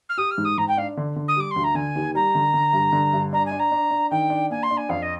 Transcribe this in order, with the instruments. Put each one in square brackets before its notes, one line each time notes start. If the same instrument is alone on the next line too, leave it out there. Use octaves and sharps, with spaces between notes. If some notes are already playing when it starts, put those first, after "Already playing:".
[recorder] F6
[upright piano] G4 [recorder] D#6
[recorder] F6
[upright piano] G#2
[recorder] D#6
[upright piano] G#2 [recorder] A#5
[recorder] G5
[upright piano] D4 [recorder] F5
[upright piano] D3
D3
[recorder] D#6
[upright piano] G3 [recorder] D6
[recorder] C6
[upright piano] D2
[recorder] A#5
[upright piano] D3 [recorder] G#5
[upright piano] D#2
[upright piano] G3 [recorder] A#5
[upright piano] D3
D3
G2
D3
G2
[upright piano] D4 [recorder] A#5
[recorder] G#5
[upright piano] D4
[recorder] A#5
[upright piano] D4
D4
[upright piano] D#3 [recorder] G5
[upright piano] D4
[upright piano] A#3 [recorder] G#5
[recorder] C6
[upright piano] D4
[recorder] G#5
[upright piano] F2 [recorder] F5
[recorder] D#5